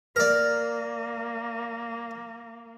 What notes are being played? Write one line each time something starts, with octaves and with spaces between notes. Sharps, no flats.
A#3 A#4 D5